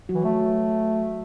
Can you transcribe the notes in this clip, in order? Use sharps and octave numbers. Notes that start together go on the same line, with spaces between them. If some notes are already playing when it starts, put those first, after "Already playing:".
F#3 F#4
E3
A3